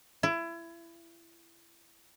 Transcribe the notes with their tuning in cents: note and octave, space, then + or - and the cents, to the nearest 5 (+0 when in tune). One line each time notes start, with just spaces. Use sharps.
E4 +25